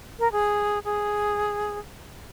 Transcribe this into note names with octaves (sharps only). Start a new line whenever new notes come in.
A#4
G#4
G#4